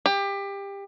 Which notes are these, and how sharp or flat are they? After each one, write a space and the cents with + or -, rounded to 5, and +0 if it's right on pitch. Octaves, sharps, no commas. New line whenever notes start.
G4 +25